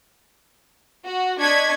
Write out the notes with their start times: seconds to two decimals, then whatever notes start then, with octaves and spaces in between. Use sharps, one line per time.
1.04 F#4
1.38 D4 D#5 C#6 G#6 B6